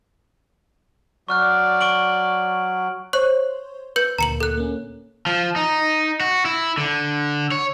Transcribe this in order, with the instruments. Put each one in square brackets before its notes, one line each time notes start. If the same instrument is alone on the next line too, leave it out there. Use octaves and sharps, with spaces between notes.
[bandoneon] F#3 [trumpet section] D5 [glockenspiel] C#6 F6 F#6
[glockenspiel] C#6 D7 F#7
[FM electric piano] C5 C#5 C6 [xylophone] C#6 F#6
[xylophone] B4 G6 C#7
[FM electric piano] D2 A#2 A#3 [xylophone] A#5 C#7 F#7
[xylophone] A4 F#6
[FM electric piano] A#3 C#4
[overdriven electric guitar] F3
D#4
F#4
E4
D3
C#5